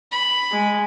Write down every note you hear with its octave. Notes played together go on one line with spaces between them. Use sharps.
B5
G#3